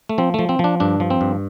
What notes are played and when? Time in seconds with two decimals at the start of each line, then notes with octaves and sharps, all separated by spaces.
0.09 A3
0.18 F3 C4
0.34 F3 A3
0.49 C4
0.59 F3 D4
0.80 G2 D4
1.00 F3
1.10 C4
1.21 G2